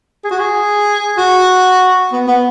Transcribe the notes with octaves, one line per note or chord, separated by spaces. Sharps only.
G#4
F#4
G#4
F#4
B3
B3